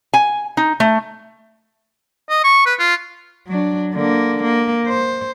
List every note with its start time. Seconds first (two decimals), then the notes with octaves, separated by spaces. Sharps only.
0.14 G#5
0.57 D#4
0.80 A3
2.29 D#5
2.44 C#6
2.66 B4
2.79 F4
3.47 F#3 D4
3.94 D3 A#3
4.43 A#3
4.87 C5